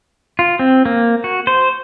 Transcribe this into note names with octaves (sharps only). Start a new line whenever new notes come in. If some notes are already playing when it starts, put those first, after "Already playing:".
F4
C4
A#3
F#4
C5